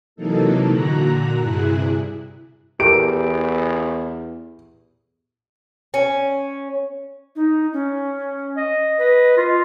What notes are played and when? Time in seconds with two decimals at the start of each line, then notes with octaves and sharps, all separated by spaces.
0.16 C3 E3 F#3 A#3 D#4 A4
0.69 A#2 D3 F#4 A#5 F#6
1.39 G2 C3 E4 G#4 F#6
2.80 E2 G4 A4 A#4 D7
5.94 C#4
7.36 D#4
7.73 C#4
8.57 D#5
8.99 B4 D#5
9.37 F4